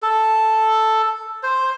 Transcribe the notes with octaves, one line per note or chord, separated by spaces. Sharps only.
A4
C5